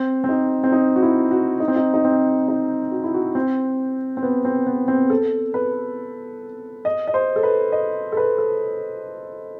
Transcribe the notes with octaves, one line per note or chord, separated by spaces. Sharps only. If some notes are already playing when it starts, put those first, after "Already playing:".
Already playing: C4
C4
D#4
C4
D#4
F#4
E4
F#4
D#4
C4
D#4
D#4
C4
D#4
F#4
E4
F#4
C4
C4
B3
C4
B3
C4
A4
B4
D#5
D#5
C5
A4
B4
D#5
A4
B4
A4